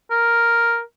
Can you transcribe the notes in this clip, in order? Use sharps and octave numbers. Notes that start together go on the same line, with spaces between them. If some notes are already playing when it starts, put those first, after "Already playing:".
A#4